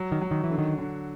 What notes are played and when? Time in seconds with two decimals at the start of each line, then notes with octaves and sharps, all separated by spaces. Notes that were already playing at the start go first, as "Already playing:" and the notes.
Already playing: F#3
0.12 D#3
0.21 F#3
0.31 D#3
0.44 E3
0.50 D3
0.58 D#3
0.78 D3